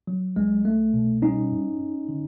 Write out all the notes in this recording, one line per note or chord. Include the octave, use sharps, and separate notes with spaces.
F#3
C2 G#3
C2 A3
B2
G3 C#4 D#4
F#2
F#2
D3